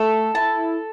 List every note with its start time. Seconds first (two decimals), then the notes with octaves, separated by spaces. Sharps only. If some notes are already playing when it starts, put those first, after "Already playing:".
Already playing: A3 A4
0.35 E4 A5